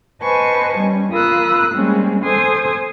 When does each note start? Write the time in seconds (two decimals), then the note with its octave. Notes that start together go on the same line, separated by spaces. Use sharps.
0.21 B4 C5 D#5 G#5 A5 C#6
0.78 G3 C#4
1.12 F4 A#4 B5 D#6 E6 F#6
1.74 G3 G#3 A#3 C4 C#4
2.24 A4 C5 G#5 C6 D#6 G#6